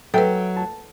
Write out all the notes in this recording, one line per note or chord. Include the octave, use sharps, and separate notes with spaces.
F#3 A4 B4 E5 G5
A5